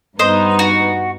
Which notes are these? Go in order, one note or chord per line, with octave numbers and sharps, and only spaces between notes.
G2 B3 D#4 C5 D#5
F#4